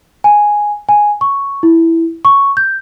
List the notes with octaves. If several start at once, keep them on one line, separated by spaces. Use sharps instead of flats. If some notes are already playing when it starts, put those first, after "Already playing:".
G#5
G#5
C#6
E4
C#6
G6